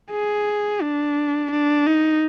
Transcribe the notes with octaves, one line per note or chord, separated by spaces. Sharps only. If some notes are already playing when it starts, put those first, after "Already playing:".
G#4
D4
D4
D#4